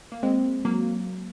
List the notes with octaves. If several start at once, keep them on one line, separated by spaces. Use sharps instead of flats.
A#3
G#3 C4
F#3 A#3